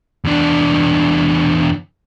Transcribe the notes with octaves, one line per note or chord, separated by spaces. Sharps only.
E2 D4